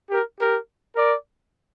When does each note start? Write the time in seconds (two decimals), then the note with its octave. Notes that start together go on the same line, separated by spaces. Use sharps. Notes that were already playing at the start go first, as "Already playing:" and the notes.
0.10 G4 A#4
0.39 G4 A#4
0.95 A#4 D5